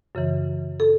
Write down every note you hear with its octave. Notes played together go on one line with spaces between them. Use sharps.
F#2 C#3 E3
A4